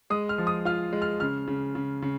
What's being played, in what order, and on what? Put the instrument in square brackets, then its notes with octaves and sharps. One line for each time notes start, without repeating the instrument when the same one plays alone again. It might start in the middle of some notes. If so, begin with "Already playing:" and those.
[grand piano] G#3 D#6
F6
F3
D#6
F4 F6
G#3
F6
C#3 F6
C#3
C#3
C#3